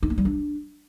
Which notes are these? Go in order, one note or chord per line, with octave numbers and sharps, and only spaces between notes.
D#4
A#3
G3
D4